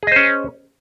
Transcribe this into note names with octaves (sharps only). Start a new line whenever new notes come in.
C#4 G#4 C5 D#5